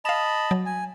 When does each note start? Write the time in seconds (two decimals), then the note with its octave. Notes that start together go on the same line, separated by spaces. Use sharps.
0.05 D#5 F5 A5 B5 E7
0.51 F#3
0.66 G#5